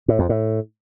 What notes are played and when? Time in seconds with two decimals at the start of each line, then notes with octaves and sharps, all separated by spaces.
0.08 A2
0.19 F2
0.29 A2